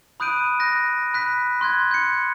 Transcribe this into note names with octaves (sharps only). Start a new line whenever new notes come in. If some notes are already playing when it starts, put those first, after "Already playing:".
B5 D#6 F#6 G6 D7 D#7
F#6 A#6
B5 F#6 B6
C6 F#6 G#6
G6 C#7